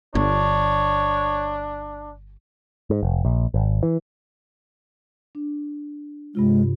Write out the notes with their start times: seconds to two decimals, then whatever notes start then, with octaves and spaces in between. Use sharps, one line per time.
0.15 G1 D4 C#5
2.90 G#2
3.03 F1
3.25 A#1
3.54 G#1
3.83 E3
5.35 D4
6.35 G2 C3 G#3 F4